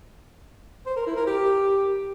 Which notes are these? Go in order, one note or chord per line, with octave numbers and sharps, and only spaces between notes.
C5
A#4
E4
A#4
G4